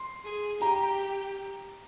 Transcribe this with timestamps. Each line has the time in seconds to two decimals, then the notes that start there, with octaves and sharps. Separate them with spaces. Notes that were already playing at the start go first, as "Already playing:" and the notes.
Already playing: C6
0.25 G#4
0.61 G4 A#5